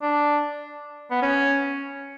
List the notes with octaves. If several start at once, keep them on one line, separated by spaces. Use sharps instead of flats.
D4
B3
C#4